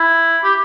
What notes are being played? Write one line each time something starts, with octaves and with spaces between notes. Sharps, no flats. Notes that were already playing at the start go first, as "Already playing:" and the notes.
Already playing: E4
G4